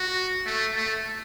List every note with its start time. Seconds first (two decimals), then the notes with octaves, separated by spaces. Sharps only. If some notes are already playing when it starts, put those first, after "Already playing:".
Already playing: F#4
0.46 A3
0.75 A3